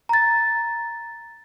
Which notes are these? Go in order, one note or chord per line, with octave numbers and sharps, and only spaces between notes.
A#5 A6